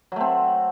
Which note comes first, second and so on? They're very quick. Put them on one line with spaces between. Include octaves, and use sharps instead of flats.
F#3 A3 C4